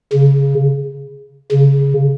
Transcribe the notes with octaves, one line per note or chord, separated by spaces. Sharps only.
C#3
C#3